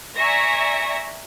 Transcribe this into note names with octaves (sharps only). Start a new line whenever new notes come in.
D5 E5 G#5 A#5 C#6 A#6